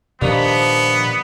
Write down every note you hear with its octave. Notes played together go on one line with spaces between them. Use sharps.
G2 A#2 D#3 F3 A#3 B3 D4